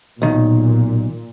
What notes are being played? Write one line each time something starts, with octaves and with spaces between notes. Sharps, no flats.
B1 A#2 D#3